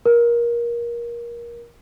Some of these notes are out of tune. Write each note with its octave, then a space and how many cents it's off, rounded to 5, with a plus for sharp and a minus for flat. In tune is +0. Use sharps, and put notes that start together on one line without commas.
A#4 +20